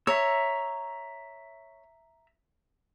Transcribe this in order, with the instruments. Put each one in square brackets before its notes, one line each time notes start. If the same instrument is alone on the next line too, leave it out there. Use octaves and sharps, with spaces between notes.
[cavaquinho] C#5 [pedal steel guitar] E5 A#5 E6